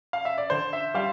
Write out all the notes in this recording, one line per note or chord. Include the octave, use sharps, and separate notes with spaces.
F5
E5
D5
D3 C5
E5
G3 F5